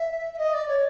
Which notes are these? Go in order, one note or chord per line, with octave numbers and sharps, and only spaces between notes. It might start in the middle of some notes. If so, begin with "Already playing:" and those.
Already playing: E5
E5
D#5
D5
C#5